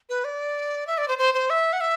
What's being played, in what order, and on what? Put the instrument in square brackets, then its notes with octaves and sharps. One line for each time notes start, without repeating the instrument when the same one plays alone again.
[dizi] B4
D5
E5
D5
C5
C5
C5
E5
F#5
E5